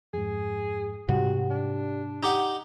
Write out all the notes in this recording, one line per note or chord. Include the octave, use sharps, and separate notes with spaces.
F2 G#2 G#4
G#2 C3 G3 F#4 G4
D4
D#4 G4 F#5